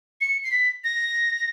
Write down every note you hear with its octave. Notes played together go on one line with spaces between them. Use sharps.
C#7
C7
B6
A#6